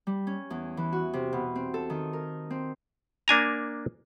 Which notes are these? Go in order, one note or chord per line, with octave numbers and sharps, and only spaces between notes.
G3
C#4
E2
E3
F#4
C3
B2
C4
A4
D#3
A#4
C4
A#3 D4 G#5 A#5